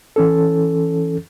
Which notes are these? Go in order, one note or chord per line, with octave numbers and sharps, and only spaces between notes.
E3 C#4 A4